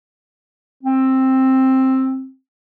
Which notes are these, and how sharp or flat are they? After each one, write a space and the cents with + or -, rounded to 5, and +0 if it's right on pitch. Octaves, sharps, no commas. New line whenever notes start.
C4 +10